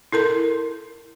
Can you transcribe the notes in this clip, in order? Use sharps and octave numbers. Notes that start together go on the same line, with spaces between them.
E4 A4 A#4 C6